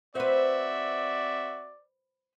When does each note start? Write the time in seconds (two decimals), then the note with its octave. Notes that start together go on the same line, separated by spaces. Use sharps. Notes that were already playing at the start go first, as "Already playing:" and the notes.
0.15 C4 F#4 B4 C5 D5 E5